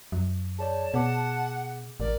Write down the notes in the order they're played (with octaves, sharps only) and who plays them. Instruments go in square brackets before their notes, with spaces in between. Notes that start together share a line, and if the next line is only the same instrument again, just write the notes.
[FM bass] F#2
[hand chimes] G#4 C#5 D5 [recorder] A5
[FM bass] B2 [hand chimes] G#4 D6 [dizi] F#5
[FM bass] A1 [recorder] A#4 [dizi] D5